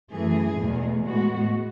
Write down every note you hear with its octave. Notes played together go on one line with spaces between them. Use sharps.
F#2 E3 A3 G#4
E2 B2 A3
A2 G#3 B3 F#4